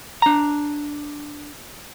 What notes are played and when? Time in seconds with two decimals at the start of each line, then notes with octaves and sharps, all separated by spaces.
0.22 D4 A#5